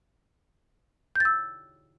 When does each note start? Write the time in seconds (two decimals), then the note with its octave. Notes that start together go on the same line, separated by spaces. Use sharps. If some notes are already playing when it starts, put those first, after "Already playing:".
1.16 G6
1.20 A6
1.25 E6